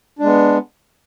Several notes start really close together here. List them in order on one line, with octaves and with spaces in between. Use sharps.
D4 G#3 B3